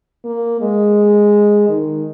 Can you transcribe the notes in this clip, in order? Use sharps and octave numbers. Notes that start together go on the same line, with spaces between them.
A#3
G#3
D#3